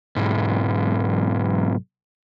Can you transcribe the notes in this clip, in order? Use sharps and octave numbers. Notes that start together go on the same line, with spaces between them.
B1 G#2